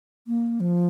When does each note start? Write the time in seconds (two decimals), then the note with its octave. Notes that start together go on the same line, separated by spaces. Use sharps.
0.27 A#3
0.60 F3